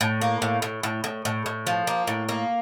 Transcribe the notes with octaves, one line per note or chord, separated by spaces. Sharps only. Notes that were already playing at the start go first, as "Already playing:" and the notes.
A2
A#3
A2
A2
A2
A2
A2
A2
F3
A#3
A2
A#3